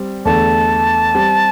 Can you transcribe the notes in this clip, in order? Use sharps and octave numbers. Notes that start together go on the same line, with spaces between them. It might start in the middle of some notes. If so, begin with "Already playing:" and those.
Already playing: G3 C4
E2 D3 A3 A5
G3 C4 G4